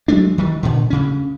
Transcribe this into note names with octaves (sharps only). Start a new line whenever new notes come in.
F#3 G#3 A3 D4
D#3 E3 G3
A#2 D3
D2 C#3 C#4